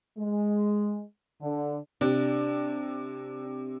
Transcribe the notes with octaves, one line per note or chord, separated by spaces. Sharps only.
G#3
D3
C3 D4